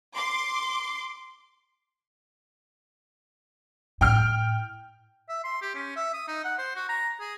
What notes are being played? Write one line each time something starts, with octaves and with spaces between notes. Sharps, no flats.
C6 D6
A2 G5 F6
E5
C6
G4
C#4
E5
D#6
D#4
F#5
C5
F#4
A#5
G#4